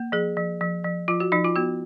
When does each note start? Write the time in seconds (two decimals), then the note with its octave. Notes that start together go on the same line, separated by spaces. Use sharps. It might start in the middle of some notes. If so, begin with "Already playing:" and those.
Already playing: A#3
0.12 F3 G#4
0.37 F3
0.61 F3
0.84 F3
1.08 F3 F4
1.20 F#4
1.32 F3 D#4
1.44 F4
1.55 B3 F#4